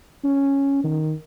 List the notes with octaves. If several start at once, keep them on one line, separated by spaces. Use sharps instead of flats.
C#4
D#3